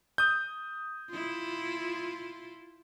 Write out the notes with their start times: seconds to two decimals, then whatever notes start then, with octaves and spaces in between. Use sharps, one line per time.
0.18 D#6 G6
1.09 E4 F4